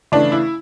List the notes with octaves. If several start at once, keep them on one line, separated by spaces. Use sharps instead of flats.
C#3 E3 A3 D4
E4